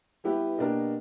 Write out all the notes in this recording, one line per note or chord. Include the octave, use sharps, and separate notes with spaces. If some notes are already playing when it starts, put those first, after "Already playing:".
G3 B3 E4 G4 B4
B2 A#3 D4 G4 A#4